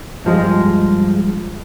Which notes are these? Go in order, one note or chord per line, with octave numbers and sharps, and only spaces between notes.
G2 F3 G#3